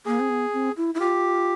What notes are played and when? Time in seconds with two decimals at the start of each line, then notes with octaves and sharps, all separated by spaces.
0.06 A#3 G#4
0.20 C4
0.29 B3
0.53 C4
0.77 E4
0.94 E4
1.00 F4 G4